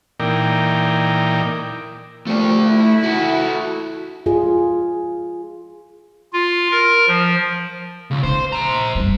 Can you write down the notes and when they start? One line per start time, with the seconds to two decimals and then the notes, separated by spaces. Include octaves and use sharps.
0.20 A#2 E3 D#4 A#4 D5 G5
2.27 A#2 F3 G3 A3 D5
2.66 E4
3.04 F#4 A4
4.26 F4 G#4
6.33 F4
6.71 A#4
7.08 F3
8.11 C#2
8.23 D#4 C5
8.52 C5 A#5
8.95 F#1 G3